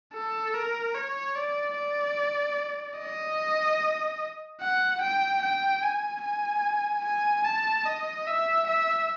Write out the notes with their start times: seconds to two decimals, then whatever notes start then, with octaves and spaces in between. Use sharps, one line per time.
0.14 A4
0.54 A#4
0.95 C#5
1.36 D5
1.76 D5
2.98 D#5
4.61 F#5
5.01 G5
5.42 G5
5.82 G#5
6.23 G#5
7.04 G#5
7.44 A5
7.86 D#5
8.26 E5
8.67 E5